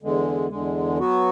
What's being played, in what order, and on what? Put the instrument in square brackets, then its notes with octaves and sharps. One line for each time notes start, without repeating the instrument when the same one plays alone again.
[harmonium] E2 D3 G#3
E2 D3 G#3
F#3 B3 F#4